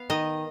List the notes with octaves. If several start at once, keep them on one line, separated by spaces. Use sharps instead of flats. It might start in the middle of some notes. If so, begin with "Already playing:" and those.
Already playing: B3 F5
D#3 D#5